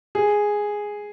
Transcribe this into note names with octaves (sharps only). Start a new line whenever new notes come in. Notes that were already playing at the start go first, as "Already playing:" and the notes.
G#4